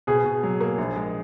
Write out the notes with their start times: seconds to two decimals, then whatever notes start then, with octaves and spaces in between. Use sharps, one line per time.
0.07 B2 G#4
0.25 B2
0.43 F#3
0.61 A#3
0.78 A#1
0.96 G#3